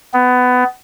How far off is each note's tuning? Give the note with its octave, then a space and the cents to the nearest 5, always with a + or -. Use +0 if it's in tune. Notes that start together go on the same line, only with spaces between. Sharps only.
B3 +20